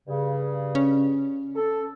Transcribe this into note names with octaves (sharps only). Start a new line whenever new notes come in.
G2 C#3
C#4
A4